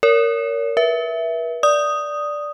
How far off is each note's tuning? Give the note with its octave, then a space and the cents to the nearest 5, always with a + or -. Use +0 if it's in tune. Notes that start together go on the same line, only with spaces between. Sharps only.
A#4 -10 C#5 +35
B4 -40 E5 +0
D5 +0 D#6 +0